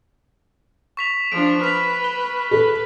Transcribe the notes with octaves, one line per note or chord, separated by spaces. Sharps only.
C#6 B6 F7
F3 D4 D7
B4 F6 B6 F7
G7
A4 B4